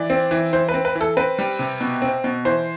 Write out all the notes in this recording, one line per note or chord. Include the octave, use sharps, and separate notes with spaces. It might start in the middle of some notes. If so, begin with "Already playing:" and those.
Already playing: E3 D5
C4
E3
E3 C5
B4
C4
B4
E3
A4
C4 B4
G3
C3
B2
C4
B2
E3 C5